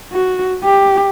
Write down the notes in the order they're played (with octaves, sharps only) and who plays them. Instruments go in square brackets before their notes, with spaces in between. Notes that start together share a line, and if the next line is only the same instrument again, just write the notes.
[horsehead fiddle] F#4
G4